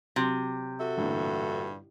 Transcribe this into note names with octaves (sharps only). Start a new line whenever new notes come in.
C3 F#3
F#4 A4 E5
A1 G2 A#2 D3